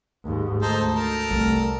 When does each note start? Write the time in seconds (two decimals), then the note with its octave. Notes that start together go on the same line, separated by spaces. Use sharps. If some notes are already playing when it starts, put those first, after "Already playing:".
0.24 D#2 G#2
0.62 D2 D#4 A4 C5
0.95 A4 A#4
1.31 C2 G3 A3